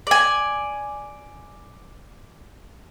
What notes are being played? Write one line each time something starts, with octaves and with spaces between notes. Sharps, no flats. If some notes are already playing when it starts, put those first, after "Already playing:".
D5 G#5